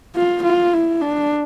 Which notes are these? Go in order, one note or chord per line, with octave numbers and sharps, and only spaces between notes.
F4
F4
E4
D4